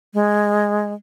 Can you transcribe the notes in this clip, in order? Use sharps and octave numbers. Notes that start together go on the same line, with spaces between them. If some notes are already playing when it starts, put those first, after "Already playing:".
G#3